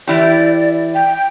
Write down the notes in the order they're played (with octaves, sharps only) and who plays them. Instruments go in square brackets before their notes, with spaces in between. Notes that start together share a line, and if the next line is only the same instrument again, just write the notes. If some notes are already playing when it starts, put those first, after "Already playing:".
[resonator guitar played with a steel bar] E3 E4 G4 [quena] D5
[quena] G5